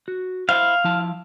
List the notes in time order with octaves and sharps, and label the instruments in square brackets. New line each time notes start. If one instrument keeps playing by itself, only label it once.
[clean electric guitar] F#4
[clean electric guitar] E4 C5 [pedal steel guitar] F5
[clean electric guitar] F3 E4 A5